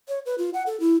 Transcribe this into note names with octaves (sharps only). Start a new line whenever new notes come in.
C#5
B4
F4
F#5
A4
E4